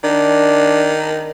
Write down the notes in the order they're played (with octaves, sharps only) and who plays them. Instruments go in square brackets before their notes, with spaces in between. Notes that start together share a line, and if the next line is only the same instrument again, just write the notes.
[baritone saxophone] D#3 [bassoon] D4